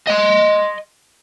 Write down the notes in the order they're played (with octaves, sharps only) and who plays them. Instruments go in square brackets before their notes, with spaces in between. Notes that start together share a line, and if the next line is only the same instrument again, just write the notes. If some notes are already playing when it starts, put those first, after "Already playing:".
[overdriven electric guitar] D#5 C6